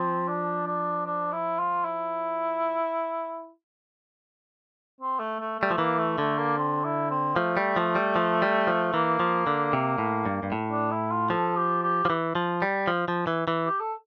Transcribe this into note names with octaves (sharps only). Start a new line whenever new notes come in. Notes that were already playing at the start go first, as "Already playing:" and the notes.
Already playing: F3 C4
D4
D4
D4
E4
F4
E4
C4
A3
A3
G3 A3
F3
E3 A#3
A3
D3 A3
A#3
C4
E4
C4
F3 A3
G3
F3
G3
F3
G3
F3
E3 A#3
F3
D3
C3
A2
G2
G2
A2
D4
E4
F4
F3 A4
G4
G4
F3
E3
F3
G3
F3
F3
E3
E3
G4
A4